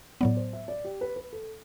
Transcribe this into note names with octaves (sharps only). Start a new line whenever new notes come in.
A2 F#3 B3 D5
C5
E5
D5
G4
B4
B4
A4